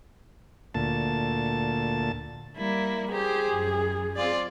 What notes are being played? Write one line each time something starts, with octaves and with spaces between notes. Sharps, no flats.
D2 A#2 A5
G3 A#3 E4
G4 G#4 C5
F#2
C4 F4 D5